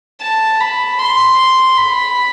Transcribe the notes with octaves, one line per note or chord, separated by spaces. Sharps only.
A5
B5
C6
B5